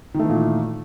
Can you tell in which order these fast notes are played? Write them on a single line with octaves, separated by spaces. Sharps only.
D#3 A3 E3 A#2